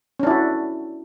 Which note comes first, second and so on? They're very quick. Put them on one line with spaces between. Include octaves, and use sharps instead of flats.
C#4 D4 E4 F#4